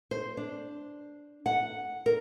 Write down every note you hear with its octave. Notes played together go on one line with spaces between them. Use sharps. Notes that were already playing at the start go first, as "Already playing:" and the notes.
C5
D4
F#5
A#4